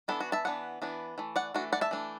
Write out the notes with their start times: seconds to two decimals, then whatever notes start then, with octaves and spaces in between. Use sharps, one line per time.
0.08 E3 B3 D4 E4 A4
0.20 F#4
0.32 E5 A5
0.45 E3 B3 D4 F#5
0.82 E3 B3 D4
1.18 E3 A3
1.36 D5 F#5
1.54 E3 A3 D4 F#4
1.73 D5 F#5
1.81 E5 A5
1.91 E3 A3 D4